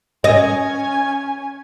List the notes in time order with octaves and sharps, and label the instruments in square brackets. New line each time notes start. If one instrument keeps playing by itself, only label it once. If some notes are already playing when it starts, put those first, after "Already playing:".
[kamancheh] C#4 G#5 [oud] D#5